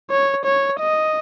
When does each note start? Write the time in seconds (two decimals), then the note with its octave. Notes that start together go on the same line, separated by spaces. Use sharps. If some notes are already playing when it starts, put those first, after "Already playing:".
0.10 C#5
0.45 C#5
0.80 D#5